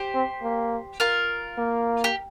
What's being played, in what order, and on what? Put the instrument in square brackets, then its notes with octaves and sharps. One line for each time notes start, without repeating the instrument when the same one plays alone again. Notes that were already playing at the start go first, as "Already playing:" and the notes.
Already playing: [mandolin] G4 C5
[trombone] C4
A#3
[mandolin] F4 A#4
[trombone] A#3
[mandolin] G4